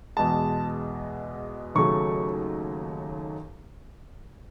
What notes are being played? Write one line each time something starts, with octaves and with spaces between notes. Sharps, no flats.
E2 B2 G#3 A5
D#2 C#3 F#3 A3 C#6